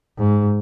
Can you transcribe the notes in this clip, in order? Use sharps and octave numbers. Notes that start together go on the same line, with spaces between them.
G#2